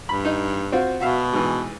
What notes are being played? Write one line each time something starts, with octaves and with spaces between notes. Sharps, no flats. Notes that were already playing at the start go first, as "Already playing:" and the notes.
G2 B5
D#4
C4 F4 F#4
B2 F#4 E5 F5
G#2 E3